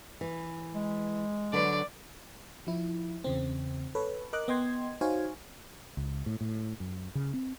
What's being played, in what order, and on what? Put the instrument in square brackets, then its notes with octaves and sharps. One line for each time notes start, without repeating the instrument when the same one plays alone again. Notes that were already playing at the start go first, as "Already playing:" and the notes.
[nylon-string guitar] E3
[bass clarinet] G#3
[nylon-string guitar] D3 F#3 B4 [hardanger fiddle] D5
[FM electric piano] F3 E4
E2 C#3 C4
A4 B4 C#5
A#4 D#5 D6 F#6
B3 D#5 G5 C6 G#6
D#4 F#4 C5 C#5 F5 G#5
[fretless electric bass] C#2
A2
A2
F#2
C#3
C4